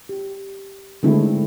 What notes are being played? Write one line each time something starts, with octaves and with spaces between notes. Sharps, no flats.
G4
D3 D#3 G#3 A3 C4 E4